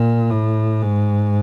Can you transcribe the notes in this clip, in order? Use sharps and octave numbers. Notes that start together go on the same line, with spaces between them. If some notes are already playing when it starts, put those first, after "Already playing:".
Already playing: A#2
A2
G#2